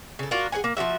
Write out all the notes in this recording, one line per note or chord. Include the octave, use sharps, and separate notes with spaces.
C#3 A4
D4 F4 F#4 A#4
G#4 B4 F#5 G#5
A#3
F3 A#3 F#4 E5